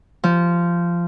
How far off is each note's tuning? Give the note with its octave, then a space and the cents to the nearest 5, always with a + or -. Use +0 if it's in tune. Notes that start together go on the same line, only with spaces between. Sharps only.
F3 -15